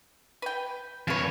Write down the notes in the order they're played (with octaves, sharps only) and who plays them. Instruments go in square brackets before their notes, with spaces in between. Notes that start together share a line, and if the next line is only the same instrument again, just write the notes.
[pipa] B4 G5
[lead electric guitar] F2 C#5 [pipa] F4 B4